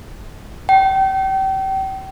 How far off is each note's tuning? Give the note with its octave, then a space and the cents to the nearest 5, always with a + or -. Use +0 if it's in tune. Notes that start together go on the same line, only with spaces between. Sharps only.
G5 -35